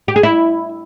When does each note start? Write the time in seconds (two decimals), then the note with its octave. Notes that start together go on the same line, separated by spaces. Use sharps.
0.08 G4
0.16 G#4
0.23 E4